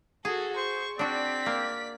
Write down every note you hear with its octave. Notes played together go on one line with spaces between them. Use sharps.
F#4 G#4 A4
C5 C#6
C4 D4 F#4 D5 B6
A#3